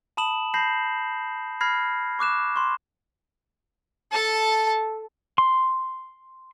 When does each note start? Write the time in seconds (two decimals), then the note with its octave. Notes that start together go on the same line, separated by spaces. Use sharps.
0.17 A5 B5 D#6 E7 F#7
0.54 A5 B5 G6 A#6 C7 F#7
1.61 B5 F6 G#6 A#6 C7
2.19 C#6 D6 F#6 E7
2.56 C6 C#6
4.12 A4 A5
5.38 C6